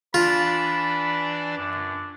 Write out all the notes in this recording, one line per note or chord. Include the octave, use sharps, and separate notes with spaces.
E3 D4 F4 D5 B5
F#2 D4